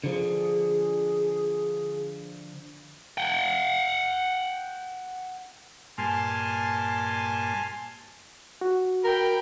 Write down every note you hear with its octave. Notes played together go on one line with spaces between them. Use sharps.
D3 F3 G#4
F#5 G5
G2 A#2 G#5 A5 C6 F6
F#4
A#4 G5 B5